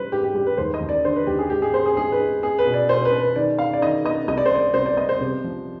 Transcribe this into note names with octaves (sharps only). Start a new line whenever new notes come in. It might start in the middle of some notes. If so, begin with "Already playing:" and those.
Already playing: G#2 G3 B4 C5
G#2 G4
G4
G3 G4
B4
D#2 C5
D#5
D#2
D5
D3 C5
B4
D#2 G4
G#4
G#2 G4
G#4
B3 C5
G#4
G#2 G#4
B4
G#2
B3 G#4
B4
B2
D5
B2 C5
B4
B2
B4
D#3 D5
B3 F5
D5
D#3 D#5
B3 D#5
C2 D#5
D5
C5
B3 D5
C2 C5
D5
B3 D#5
C5
C3
F3